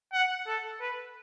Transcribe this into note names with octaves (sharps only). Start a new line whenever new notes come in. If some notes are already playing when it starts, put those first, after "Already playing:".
F#5
A4
B4